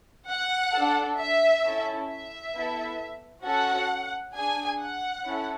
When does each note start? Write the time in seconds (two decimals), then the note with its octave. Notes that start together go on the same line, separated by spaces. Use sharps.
0.29 F#5
0.74 D4 A4
1.19 E5
1.64 C#4 E4 A4
2.09 E5
2.55 B3 E4 A4
3.44 C#4 F#4 A4 F#5
4.35 D4 G#4 G#5
4.81 F#5
5.25 C#4 E4 A4